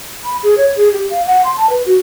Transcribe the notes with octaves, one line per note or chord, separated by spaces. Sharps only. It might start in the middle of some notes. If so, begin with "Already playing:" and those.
B5
G#4
C#5
G#4
G4
F5
F#5
C6
A5
B4
F#4